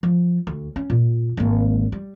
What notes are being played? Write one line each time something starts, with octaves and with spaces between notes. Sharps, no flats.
F3
D2
C#4
A#2
G#1 A#3
G3